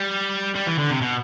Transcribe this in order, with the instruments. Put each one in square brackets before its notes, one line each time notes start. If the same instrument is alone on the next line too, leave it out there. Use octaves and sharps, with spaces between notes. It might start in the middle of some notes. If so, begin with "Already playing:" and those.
Already playing: [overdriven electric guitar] G3
G3
E3
D3
C3
B2